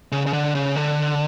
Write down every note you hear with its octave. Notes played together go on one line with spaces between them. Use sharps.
C#3
C#3
D3
C#3
D3